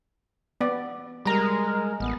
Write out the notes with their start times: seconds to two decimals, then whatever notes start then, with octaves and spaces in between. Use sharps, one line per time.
0.61 B3 D5
1.25 G3 G#3 A#4 A#5
2.00 A1 B3